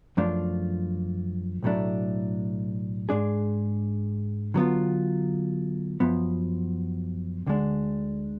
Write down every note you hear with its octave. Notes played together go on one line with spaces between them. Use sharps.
F#2 F3 A3 D4 F4
B1 A2 F#3 A3 D4
G#2 G#3 D4 G#4
D3 F#3 B3 F4
F#2 F3 B3
D2 D3 G#3 D4